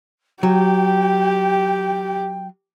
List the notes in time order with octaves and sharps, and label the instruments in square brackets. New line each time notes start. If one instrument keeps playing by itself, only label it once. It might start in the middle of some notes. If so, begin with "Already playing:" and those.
[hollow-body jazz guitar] F#3 [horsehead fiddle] G4 [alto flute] G5